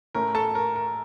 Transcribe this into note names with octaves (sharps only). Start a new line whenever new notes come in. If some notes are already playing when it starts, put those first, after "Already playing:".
A2 A3 C#4 A#4
A4 A5
A#4
A#4